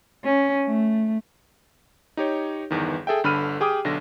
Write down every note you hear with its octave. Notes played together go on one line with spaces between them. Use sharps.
C#4
A3
D#4 G4 C#5
G1 E2 D#3
G#4 A4 E5 G5
G1 D3 B5 F6 D#7
G4 G#4 G5 D6 D#6
B1 D3 A#6